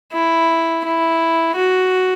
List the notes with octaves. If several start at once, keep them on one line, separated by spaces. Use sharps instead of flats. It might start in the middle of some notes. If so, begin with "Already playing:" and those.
E4
E4
F#4